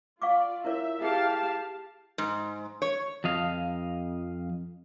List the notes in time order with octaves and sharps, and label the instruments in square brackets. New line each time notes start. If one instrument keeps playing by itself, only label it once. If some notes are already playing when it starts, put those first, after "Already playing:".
[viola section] F4 D5 [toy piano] F5 C#6 D6
[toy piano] E4 A#4 C#5 [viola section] E5
[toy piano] E4 G#4 [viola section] G4 F5 A5
[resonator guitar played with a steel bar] G#2
C#5
[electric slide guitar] F2 F3 D#5 F5